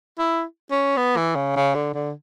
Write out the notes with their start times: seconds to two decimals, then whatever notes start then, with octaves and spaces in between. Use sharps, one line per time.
0.19 E4
0.71 C#4
0.97 B3
1.17 E3
1.36 C#3
1.56 C#3
1.75 D3
1.94 D3